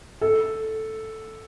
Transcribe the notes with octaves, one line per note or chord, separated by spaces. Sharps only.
A4